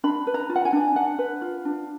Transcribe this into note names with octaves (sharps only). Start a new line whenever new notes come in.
D4 B5
B4
A#5
F4
F#5
G#5
D4
D4 F#5
B4
F4
D4